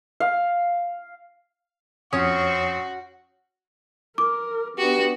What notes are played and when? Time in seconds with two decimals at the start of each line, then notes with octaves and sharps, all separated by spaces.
0.20 F5
2.13 F2 C4 C#4 F#4 C5 C#5 C#6 D#6
4.18 A#4 D6
4.78 B3 D4 F#4 G4